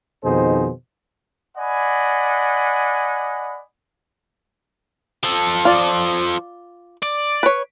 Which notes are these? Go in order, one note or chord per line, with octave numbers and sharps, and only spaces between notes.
F2 B2 D#3 D#4 G#4 C5
D5 D#5 F#5 G#5 B5
F3 A4
F4 D5
D5
B4 C#5